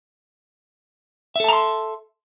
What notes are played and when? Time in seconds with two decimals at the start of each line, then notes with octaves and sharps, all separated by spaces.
1.36 E5
1.40 A4
1.44 A5
1.49 A#5
1.53 C6